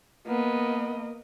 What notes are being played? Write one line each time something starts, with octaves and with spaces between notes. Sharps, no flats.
A#3 B3 D#5